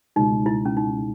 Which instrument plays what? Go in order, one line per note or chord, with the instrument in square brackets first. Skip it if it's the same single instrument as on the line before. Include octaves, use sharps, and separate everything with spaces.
[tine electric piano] C#2 B2 G#3 [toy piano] D#4
[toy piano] E4
C#4
D#4